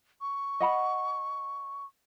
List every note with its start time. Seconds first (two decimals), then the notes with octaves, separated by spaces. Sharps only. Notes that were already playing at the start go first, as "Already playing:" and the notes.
0.21 C#6
0.60 D#5 F#5 B5